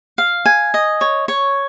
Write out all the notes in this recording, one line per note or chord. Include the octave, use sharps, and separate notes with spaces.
F5
G#5
D#5
C#5
C#5